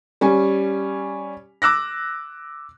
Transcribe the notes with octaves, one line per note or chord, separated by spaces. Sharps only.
G3 C#4 G#5
D6 E6 F#6 A#6